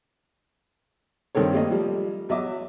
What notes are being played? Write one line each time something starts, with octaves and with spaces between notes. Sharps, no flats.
G2 D#3 C4 A4 C#5
G3 A3 A#3 D#5
F3 G3
E2 F#3 D#5 E5 D6